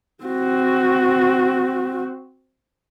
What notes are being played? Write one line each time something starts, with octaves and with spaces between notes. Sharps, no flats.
C4 F#4